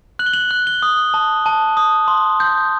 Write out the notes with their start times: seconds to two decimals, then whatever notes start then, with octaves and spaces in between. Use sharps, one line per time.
0.19 F#6 F#7
0.26 G7
0.33 F#7
0.51 F#6
0.67 G7
0.82 D#6
1.14 A5
1.46 A5
1.77 D#6
2.08 C6
2.40 G6